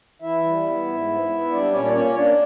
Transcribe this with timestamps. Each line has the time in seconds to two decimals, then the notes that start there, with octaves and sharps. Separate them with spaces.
0.22 E3 E4 E5
0.44 G3
0.66 B3
0.87 G#2
1.08 B3
1.29 B3
1.51 G3 D4 D5
1.72 A#2 C#4 C#5
1.85 D5
1.93 A#3 C#4 C#5
2.15 A#3 D4 D5